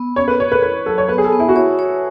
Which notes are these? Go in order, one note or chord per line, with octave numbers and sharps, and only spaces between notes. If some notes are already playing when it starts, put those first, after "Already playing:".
Already playing: B3
C#4 C#5
B4
C#4 C#5
B4
E4 B4
F#3 A4
C#5
B3 B4
G#4
A4
B3
E4
F#4
E4 C#5
C#5